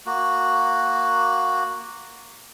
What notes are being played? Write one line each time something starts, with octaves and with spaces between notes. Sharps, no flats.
A#3 F#4